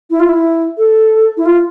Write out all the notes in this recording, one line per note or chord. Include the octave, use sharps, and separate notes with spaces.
E4
F4
E4
A4
E4
F4